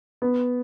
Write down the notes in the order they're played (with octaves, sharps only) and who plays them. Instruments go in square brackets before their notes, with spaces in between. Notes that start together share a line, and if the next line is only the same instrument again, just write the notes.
[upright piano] B3